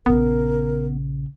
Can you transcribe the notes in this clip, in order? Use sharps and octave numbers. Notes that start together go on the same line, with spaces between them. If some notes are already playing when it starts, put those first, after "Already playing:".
A#1 C#3 B3 A#4